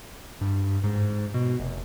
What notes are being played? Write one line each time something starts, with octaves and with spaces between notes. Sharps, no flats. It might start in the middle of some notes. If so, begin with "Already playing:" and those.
G2
G#2
B2
F1